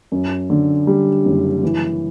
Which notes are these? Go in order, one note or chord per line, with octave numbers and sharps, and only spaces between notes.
F#2
D3
G3
F#1
E3